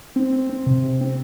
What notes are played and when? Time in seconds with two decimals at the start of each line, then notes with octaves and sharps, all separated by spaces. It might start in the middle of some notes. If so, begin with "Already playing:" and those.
0.16 C4
0.33 C4
0.49 C4
0.66 C3
0.83 C3
1.01 C4